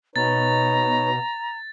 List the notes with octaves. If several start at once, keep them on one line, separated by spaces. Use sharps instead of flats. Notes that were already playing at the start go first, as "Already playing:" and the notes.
B2 D#4 B4 C#5 A#5 A6